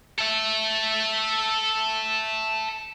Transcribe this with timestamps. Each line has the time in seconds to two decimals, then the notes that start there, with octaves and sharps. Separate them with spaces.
0.19 A4 E5